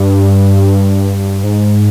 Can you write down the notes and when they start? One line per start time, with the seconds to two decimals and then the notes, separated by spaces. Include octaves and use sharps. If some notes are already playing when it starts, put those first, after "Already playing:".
Already playing: G2
1.43 G#2